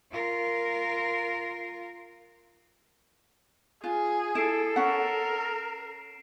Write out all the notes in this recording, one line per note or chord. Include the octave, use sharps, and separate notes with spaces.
F4 A#4
F4 G#4
E4 A4 C7 D7 E7
C#4 A#4 F#5